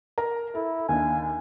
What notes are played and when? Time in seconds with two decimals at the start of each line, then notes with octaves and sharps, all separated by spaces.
0.18 A#4 A#5
0.55 E4 A4
0.89 D#2 D4 G#5